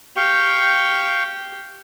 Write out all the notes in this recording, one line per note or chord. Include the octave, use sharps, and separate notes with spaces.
G4 F5 G5 C#6